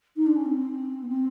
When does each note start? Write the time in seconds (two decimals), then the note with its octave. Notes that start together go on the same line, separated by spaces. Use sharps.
0.16 D#4
0.26 D4
0.36 C#4
0.45 C4
1.02 B3
1.09 C4